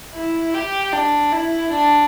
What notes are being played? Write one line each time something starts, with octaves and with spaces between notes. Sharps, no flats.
E4
G4
D4
E4
D4